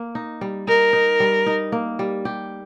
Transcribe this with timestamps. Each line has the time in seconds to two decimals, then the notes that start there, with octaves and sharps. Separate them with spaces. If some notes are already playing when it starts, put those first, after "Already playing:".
Already playing: A#3
0.15 D#4
0.41 G3
0.68 D#4 A#4
0.93 D#4
1.20 G3
1.46 D#4
1.72 A#3
1.99 G3
2.25 G4